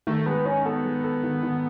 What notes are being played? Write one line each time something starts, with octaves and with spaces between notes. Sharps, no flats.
D#3 A3
G#3 B3
C#4 D#4
B3 A4
G#3
A4
D#3
D#3